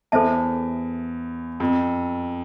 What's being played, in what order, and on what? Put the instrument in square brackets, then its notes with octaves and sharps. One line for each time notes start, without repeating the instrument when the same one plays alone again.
[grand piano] E2 [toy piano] A4 C5 E5 A5
[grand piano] F2